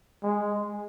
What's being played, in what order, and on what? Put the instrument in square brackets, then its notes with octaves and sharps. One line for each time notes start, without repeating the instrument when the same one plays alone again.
[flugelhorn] G#3